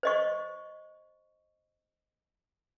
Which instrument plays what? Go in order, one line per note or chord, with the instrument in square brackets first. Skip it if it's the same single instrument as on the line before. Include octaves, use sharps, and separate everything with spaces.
[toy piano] C5 D#5 C#6